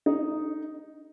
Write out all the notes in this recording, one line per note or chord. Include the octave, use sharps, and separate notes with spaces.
D#4